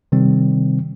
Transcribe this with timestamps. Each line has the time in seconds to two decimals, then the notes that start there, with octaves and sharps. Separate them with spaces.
0.12 C3 D#3 G3 C4